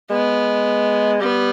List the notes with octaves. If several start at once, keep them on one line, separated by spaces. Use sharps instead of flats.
G#3 B3
G3 B3